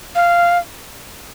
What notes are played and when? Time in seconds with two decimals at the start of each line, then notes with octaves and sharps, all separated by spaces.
0.15 F5